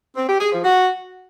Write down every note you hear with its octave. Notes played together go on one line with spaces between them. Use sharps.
C4
G4
G#4
F3
F#4